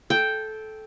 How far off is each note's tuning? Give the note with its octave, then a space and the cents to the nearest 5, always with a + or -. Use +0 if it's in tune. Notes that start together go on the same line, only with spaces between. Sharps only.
A4 -15 G5 +0